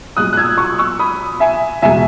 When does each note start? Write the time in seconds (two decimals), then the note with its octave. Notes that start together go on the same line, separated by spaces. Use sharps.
0.17 B1 A#2 G#3 D#6 F#6
0.33 F#6
0.37 E6 G#6
0.58 C#6 E6
0.78 C#6 E6
0.99 B5 D#6
1.40 E5 G#5
1.82 E1 E2 B2 G#3 E5 G#5